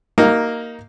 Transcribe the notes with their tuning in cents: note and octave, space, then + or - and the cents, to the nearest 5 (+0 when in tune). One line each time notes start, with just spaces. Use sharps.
A#3 +0 D#4 +10 F#4 +45